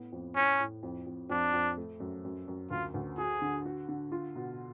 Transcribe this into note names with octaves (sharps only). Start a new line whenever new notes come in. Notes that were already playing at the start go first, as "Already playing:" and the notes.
Already playing: A2 B3
F2
A2 C#4
A2
F2
F2
F2 D4
F2
A3
F#2
F#2
F#2
D2 F4
D2
F#4 G#4
D3
F#4
D3
F4
B2